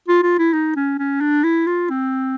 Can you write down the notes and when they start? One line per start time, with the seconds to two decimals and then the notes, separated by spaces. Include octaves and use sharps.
0.09 F4
0.23 F4
0.39 E4
0.53 D#4
0.76 C#4
0.99 C#4
1.21 D4
1.44 E4
1.67 F4
1.90 C4